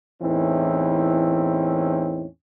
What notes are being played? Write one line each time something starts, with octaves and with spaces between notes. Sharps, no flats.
E2 A2 E3 C4 C#4 D#4